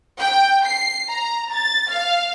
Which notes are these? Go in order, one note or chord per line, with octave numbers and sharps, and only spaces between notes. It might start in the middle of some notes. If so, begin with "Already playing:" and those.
G5
C7
A#5
A6
F5